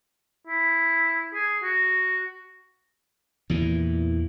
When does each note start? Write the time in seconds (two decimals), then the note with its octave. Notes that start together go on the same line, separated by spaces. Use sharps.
0.47 E4
1.34 G#4
1.63 F#4
3.50 E2 A#2 E3